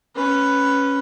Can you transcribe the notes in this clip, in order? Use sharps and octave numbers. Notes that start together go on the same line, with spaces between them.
C#4 B4